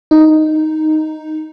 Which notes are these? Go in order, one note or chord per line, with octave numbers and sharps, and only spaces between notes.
D#4